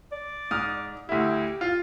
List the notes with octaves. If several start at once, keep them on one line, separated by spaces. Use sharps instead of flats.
D5
G#2 D#6 F6
D2 E4 G4
F4